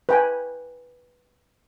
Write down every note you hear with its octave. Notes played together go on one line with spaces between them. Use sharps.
B4 G5 G#5